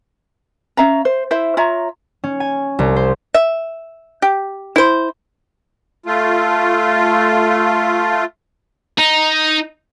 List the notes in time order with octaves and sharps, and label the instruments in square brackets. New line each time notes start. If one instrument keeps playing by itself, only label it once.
[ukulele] C#4 E5 F5 A#5
C5
E4 C5 E5
F4 C#5 E5 A#5
[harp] C#4
G#5
C2
C5
[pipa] E5
G4
E4 C5
[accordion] A3 F4
[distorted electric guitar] D#4